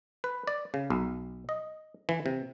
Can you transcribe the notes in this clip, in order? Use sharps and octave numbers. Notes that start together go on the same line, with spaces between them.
B4
D5
C#3
B1
D#5
E3
C3